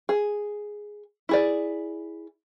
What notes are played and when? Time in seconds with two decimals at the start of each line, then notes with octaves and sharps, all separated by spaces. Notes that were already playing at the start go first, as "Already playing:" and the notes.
0.09 G#4
1.29 E4 G#4 D5